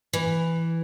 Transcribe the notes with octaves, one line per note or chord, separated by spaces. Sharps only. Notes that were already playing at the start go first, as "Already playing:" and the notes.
E3